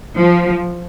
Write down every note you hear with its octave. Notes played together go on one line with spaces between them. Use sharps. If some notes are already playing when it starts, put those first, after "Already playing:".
F3